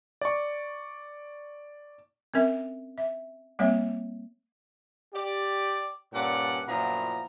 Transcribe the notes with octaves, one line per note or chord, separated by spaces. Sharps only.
D5 C#6
C4 C#4 A#4 E5
E5
G3 A#3 C4 C#5 E5
G4 D5
G2 A#2 C#4 D5 F#5
F#2 A#2 F3 B3 E4 A#5